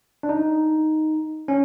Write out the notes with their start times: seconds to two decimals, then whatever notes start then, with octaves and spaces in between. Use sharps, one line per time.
0.23 D4
0.29 D#4
1.48 C#4